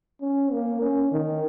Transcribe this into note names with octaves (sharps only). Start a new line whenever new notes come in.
C#4
A#3
C#4
D#3